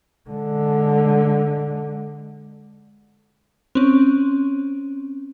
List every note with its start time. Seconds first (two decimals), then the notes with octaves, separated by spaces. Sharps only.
0.30 D3 G#3
3.75 C4 C#4